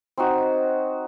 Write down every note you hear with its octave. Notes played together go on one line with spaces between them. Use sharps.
C4 D#4 F#4